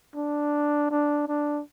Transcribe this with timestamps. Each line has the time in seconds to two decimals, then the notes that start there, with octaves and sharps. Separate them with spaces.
0.15 D4
0.91 D4
1.28 D4